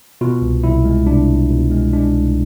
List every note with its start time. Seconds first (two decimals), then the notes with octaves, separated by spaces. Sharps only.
0.21 B2 F4
0.42 C2
0.64 C2 E4
0.85 G#3
1.06 C2 D4
1.29 C2
1.50 B2
1.71 G#3
1.93 G#3 D4
2.14 C2